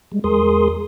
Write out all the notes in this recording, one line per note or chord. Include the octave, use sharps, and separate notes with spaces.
G3 G#3
E2 G#3 G#4 A#4 C6 D#6